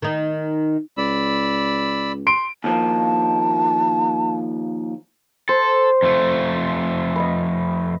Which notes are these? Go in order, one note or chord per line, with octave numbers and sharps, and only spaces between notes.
D#3 D#4
C#2 D5 B5 E6
C6 D7
D#2 F3 A#3 A5
A4 C5
F2 A3
B4 D#5